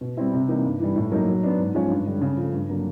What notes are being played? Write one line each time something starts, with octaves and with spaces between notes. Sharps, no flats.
B2
G3 C4 E4
C3
E3 G3 A#3 D#4
G2
E3 G3
A2
F#3 A#3 D#4
F#3
B3 D4
G#2
F3 G#3 C#4
G2
D3 G3
C#3
F3 A3
G2
D3 F#3 A#3